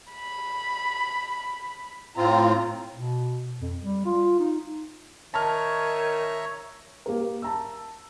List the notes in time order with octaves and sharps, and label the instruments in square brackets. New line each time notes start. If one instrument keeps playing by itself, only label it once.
[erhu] B5
[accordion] A2 C4 F4 [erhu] A#5
[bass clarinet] B2
F2
G3
F4
D#4
[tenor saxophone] D#3 [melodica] C#5 E5 A#5 [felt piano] A5 F6
[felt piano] A#3 G4 A#4
A5 A#5 E6